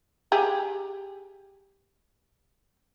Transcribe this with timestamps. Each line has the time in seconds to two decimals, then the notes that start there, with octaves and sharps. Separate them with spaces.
0.32 G4 G#4